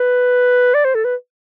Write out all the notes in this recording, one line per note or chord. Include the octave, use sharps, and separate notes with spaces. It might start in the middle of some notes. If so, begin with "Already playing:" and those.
Already playing: B4
D5
C5
A4
B4